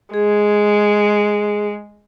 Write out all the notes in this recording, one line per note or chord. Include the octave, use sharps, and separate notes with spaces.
G#3 G#4